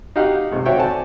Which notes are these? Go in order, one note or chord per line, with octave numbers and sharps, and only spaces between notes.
D#4 F#4 G4 F5 F#5
G#1 C3
C4 F#4 C#5 E5 F#5 G5
F#4 D5 G#5 A5